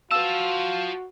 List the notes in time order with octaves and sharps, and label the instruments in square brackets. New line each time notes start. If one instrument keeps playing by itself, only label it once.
[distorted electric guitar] F4 A5 [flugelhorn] F#4 [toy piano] B4 E6 [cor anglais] F5